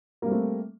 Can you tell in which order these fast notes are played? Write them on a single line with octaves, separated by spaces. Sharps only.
A#3 G3 C4 A3